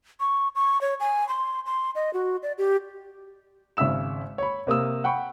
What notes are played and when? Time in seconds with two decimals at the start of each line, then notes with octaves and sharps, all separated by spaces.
0.20 C#6
0.55 C#6
0.81 C#5
1.00 G#5
1.29 C6
1.66 C6
1.95 D#5
2.13 F#4
2.43 D5
2.58 G4
3.77 G#1 C#3 E5 E6 E7
4.38 C#5 B5
4.67 C3 A#3 D#6 E6
5.04 F#5 G5 B5 C#6